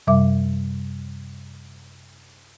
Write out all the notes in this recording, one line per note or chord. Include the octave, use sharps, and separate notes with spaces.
F#2 C3 G3 E5 D6